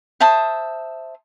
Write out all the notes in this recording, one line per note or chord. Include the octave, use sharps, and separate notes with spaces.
C5 E5 A5 D#6